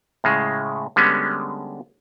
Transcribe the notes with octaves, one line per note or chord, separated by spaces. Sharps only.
A2 C#3 G#3
D3 G3 G#3 B3 C#4